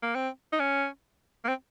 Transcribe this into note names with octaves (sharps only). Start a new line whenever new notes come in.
A#3
C4
D#4
C#4
A#3
C4